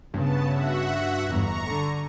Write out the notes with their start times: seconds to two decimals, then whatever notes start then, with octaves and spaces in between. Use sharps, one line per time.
0.14 G2 C#3 B3 A5
0.47 F#4 E5 F#5
1.27 G1 E2 A#5 C#6
1.65 D3